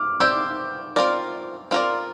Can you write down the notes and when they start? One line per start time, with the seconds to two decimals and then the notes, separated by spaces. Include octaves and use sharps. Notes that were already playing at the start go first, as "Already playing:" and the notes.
Already playing: D6 F6
0.20 C4 G4 D5 E6 G6
0.96 C4 F4 A#4 D5
1.71 C4 F4 A#4 D5